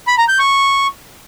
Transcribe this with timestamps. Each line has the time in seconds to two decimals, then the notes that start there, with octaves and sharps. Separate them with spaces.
0.07 B5
0.18 A#5
0.29 G6
0.39 C#6